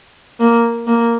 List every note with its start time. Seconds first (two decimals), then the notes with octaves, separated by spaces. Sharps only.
0.40 A#3
0.87 A#3